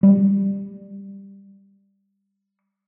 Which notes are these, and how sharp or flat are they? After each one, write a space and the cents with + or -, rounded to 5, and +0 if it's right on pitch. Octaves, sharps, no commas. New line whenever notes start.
G3 +10